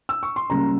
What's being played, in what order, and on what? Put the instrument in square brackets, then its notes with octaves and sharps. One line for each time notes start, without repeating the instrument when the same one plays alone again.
[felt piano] E6
C#6
C6
C#2 C#3 G3 A#3 C#4 A#5